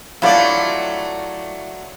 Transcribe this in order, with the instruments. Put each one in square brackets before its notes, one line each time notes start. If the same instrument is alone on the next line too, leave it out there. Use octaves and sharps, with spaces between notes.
[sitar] F#3 A3 D5 [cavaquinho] E4 F4